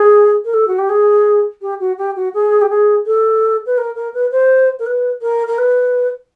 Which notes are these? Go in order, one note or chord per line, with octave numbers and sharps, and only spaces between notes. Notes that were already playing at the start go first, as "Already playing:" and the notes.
Already playing: G#4
A#4
A4
F#4
G4
G#4
G4
F#4
G4
F#4
G#4
G4
G#4
A4
B4
A#4
A#4
B4
C5
A#4
B4
A#4
A#4
B4